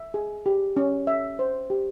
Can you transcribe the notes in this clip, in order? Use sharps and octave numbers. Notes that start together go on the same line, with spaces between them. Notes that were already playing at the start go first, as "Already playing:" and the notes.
Already playing: E5
G#4
G4
C#4
E5
C5
G4